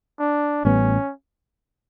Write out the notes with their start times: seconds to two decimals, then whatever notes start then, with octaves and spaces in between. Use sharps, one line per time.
0.20 D4
0.65 A1 A2 G3 B3 C#4